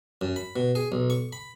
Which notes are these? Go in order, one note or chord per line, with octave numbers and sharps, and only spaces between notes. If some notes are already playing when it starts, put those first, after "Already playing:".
F#2
B5
B2
G#4
B1
C#6
B5